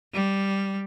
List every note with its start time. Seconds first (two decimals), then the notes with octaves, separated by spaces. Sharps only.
0.14 G3